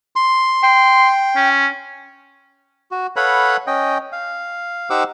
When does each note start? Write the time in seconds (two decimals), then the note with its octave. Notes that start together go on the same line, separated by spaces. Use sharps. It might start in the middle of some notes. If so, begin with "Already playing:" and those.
0.16 C6
0.63 G5 C6
1.36 C#4
2.91 F#4
3.16 A4 B4 C#5 F5 F#5 B5
3.67 C#4 D#5 G5
4.12 F5
4.90 D#4 G4 C5 F#5 D6 E6